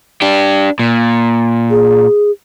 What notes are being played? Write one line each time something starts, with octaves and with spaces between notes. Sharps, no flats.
D4 G4
A#2
G#4